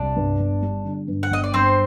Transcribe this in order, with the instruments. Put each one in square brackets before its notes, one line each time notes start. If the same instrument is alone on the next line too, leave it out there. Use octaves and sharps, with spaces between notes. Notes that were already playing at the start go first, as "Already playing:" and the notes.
Already playing: [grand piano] C2 [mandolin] D4 D5
[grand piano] G2
G1
G3
D3
G2
[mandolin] F#5
[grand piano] G1 [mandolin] D#5
[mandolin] D5
[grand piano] G2 [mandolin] C4 C5